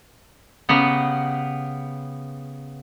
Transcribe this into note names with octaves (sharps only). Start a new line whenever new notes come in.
C#3 B3 G4 A#5